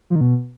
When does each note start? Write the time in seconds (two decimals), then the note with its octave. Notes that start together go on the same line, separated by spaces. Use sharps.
0.10 F3
0.16 D#3
0.21 B2